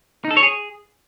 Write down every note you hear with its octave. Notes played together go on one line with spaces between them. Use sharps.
D#4
A4
C#5
G#4